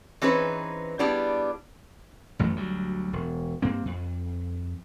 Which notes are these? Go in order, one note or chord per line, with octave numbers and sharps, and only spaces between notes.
E3 C4 C#4 D#4 G#4 B4
G3 B3 D4 E4 G4 G#4
A1 F#2 E3 A3
D2 F#3 G3
E1
G2 A#3 C4
F2